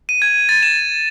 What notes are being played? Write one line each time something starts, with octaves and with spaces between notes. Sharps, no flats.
D#7
G#6
A6
E7